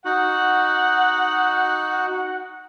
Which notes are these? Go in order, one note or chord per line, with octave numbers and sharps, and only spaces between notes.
D#4 F#4 F#5